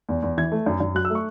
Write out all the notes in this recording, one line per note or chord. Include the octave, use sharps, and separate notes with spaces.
E2
E2
E3 G#6
A3
F#2
F#2
F#3 F#6
E6
A3
C#6